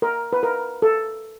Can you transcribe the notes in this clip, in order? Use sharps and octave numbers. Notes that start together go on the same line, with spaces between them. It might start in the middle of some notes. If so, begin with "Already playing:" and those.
A#4
B4
A#4
A4